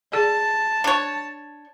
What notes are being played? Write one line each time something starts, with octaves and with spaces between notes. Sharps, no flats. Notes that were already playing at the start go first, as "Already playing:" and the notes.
G#4 D5 A5
D4 C#5